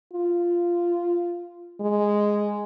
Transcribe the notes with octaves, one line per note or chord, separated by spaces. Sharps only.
F4
G#3